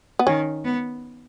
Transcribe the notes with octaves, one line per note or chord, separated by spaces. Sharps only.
B3
D#3 C#4
B3